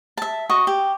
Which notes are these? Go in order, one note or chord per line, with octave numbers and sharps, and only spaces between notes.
E5 A5
F#4 D#5 C#6
G4